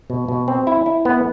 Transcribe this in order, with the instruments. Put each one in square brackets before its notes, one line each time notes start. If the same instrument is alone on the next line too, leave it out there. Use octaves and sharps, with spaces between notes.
[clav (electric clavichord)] B2
B2
C4
E4
E4
B3